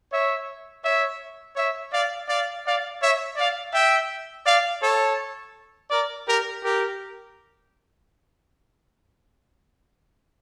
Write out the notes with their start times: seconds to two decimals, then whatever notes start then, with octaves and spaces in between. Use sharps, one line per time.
0.12 C#5 E5
0.84 C#5 E5
1.56 C#5 E5
1.93 D5 F5
2.28 D5 F5
2.66 D5 F5
3.01 C#5 E5
3.37 D5 F5
3.74 E5 G5
4.46 D5 F5
4.81 A4 C#5
5.90 A#4 D5
6.27 G4 A#4
6.63 G4 A#4